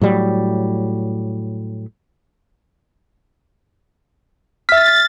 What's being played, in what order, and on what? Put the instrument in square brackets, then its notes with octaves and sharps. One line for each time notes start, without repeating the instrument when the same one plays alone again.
[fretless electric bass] A2 F#3 G3
[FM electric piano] E5 B6 [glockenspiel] F6 [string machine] A6